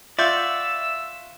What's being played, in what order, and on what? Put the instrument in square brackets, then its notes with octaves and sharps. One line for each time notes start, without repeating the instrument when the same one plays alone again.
[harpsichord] F4 F#5 C#6 [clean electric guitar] D5 [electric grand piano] E5 G6 [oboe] E6